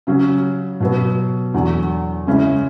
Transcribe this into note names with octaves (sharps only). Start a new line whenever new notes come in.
C#3 F#3 C#4
B2 F#3 B3
E2 D3 F#3
C#3 G#3 C#4 E4